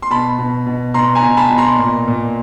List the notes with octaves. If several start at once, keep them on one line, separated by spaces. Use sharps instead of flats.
C6
B2 A5 B5
B2
B2
B2 A#5 C6
G#5 A#5
B2
A5 B5
B2
A#5 C6
A#2
A#2